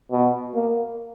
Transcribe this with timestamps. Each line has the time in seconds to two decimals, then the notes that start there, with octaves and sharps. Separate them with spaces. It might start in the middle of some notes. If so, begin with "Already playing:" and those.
0.12 B2
0.54 A#3